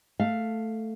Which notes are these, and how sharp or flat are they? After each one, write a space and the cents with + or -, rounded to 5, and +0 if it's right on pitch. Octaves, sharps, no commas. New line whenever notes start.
A3 +5 F5 +0